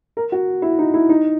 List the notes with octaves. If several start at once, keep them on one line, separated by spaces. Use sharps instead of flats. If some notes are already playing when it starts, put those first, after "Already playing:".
A#4
F#4
E4
D#4
E4
D#4